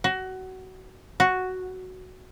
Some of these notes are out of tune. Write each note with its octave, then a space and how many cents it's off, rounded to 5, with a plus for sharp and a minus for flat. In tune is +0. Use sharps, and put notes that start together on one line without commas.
F#4 +20
F#4 +0